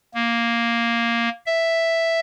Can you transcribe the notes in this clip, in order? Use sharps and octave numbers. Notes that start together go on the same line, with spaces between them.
A#3
E5